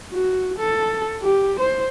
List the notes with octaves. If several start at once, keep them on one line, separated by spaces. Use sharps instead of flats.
F#4
A4
G4
C5